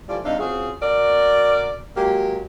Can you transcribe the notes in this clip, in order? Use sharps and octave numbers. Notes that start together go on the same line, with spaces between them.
E3 F3 G3 A3 D5
G#2 C3 D4 D#4 E5 F5
C4 C#4 F4 F#4 G#4
B2 F#4 A#4 D5
F#3 G#3 A#3 G4